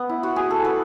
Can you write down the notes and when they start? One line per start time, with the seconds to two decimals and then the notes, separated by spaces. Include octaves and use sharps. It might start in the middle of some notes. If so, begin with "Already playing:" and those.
Already playing: B3
0.09 E4
0.23 F#4
0.36 G#4
0.50 A4
0.65 B4